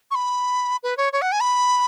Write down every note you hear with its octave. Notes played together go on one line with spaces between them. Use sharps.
C#6
B5
B4
C#5
C#5
F#5
G#5
B5